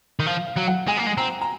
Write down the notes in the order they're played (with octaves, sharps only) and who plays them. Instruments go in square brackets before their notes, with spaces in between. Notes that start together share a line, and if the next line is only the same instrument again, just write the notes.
[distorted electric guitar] D#3
[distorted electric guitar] F3 [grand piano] F5
[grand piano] F5
[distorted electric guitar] F#3
[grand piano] F#5
[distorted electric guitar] G#3 [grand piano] G#5
[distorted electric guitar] A#3
G#3
[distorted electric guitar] C4 [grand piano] A#5
[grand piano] A#5